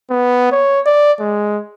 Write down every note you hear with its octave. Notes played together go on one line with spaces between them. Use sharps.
B3
C#5
D5
G#3